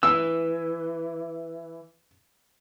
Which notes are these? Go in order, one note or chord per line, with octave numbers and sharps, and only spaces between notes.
E3 E6